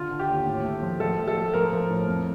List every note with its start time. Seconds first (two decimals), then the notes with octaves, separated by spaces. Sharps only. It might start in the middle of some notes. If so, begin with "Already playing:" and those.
Already playing: D3 F4
0.11 D3
0.19 G4
0.29 D#2
0.46 A2
0.64 A3
0.82 F3
1.00 F3 A4
1.18 A3
1.28 A4
1.37 A3
1.54 F3 A#4
1.73 F3
1.90 A2
2.08 F2